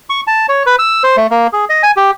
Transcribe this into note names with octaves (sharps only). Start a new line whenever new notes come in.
C#6
A5
C#5
B4
E6
C5
A3
A#3
G#4
D#5
G#5
G4